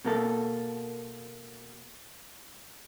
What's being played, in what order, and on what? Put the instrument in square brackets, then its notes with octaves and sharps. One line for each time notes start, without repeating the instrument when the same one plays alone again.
[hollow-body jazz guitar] B2 A#3 A4